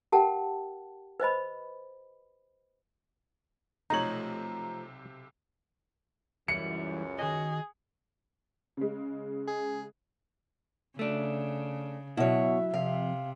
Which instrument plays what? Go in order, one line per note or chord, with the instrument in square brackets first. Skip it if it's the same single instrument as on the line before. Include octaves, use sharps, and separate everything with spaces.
[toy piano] G4 A#4 F#5 G5 A5
B4 C5 D#5 B5
[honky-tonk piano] B1 C3 F#7 [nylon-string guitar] F3 A3 [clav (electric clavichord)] D#4 C#5 [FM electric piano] A#5
[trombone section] C#2 F#2 [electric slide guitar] E3 G3 E4 [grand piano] C#7
[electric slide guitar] D#3 F#4 D#5 [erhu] G#4
[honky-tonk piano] C#3 G#3
[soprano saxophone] G#4
[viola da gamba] C#3 [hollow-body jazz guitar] A3 D4
[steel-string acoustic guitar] B2 C#5 [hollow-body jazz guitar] F#3 E4 [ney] E5
[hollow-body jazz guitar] F2 [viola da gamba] C3 [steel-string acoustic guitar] F5